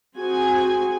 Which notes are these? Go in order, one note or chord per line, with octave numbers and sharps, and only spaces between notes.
C4 F#4 G#4 G#5